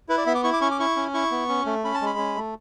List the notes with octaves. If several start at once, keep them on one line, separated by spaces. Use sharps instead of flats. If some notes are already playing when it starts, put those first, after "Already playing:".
E4 B4
D5
B3 E5
D6
E4 C#6
D6
C#4 C#6
D6
E4 C#6
C#4
E4 C#6
B3
C#4
A3
C#4 B5
A5
G#3 B5
C#4
A3